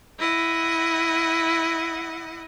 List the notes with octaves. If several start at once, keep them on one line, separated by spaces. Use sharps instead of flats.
E4 D#5 F#5